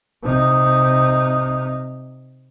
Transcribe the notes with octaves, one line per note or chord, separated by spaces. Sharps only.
C3 D#4